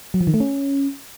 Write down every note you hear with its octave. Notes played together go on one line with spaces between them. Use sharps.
F#3
F3
D#3
A3
C#4